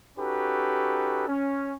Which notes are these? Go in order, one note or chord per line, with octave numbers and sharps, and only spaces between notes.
C#4 D#4 F#4 G4 A4 B4
C#4